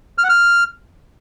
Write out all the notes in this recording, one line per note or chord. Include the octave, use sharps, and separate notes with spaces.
F6
F#5
F6